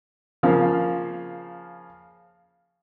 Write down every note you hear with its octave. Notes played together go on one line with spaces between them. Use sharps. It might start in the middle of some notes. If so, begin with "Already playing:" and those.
C#3 F3 A#3 F4 F5